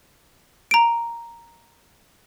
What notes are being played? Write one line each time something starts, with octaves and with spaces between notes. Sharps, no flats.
A#5 D7